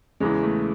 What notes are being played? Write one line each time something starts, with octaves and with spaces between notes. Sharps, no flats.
E2 C#3 E3 G#3
A3